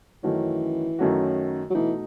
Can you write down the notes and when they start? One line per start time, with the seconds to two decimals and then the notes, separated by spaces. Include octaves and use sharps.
0.23 F#2 D#3 E3 A3 C#4 F#4
0.99 F#2 D#3 A3 C#4 F#4
1.70 F#3
1.75 B2 E3 A3 D#4